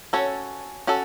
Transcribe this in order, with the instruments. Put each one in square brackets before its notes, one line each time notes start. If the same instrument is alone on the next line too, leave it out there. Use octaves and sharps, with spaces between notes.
[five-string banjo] C#4 F#4 A4 C#5
C#4 F#4 A4